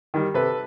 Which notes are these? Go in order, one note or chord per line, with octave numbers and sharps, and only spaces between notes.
D#3 G3
C3 A4 B4